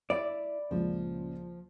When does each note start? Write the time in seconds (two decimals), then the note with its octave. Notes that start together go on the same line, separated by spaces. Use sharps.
0.10 E4 D5
0.71 C#2 A#2 C#3 F3